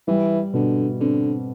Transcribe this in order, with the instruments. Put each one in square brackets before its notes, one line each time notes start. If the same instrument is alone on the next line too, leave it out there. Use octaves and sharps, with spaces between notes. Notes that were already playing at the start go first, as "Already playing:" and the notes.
[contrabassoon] E3 [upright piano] G3
[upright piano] B2 [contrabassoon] D3
[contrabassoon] D3 [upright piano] C4